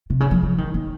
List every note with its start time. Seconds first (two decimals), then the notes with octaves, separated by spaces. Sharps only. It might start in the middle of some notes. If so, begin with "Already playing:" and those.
0.10 C3
0.20 C#3
0.31 F3
0.42 F3
0.58 D#3
0.74 D#3